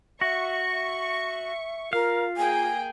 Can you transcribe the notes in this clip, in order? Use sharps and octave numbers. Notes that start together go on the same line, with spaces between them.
F#4 E5 C#6
E5
F4 A#4 F5
A#3 G#4 G5 G#5